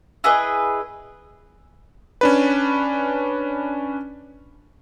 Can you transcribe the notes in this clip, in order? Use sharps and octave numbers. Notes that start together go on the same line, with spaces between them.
E4 G#4 B4 D#5
C#4 D4 B4